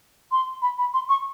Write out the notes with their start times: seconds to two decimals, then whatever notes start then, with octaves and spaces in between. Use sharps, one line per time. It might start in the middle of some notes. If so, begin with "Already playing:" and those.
0.32 C6
0.62 B5
0.78 B5
0.94 C6
1.09 C#6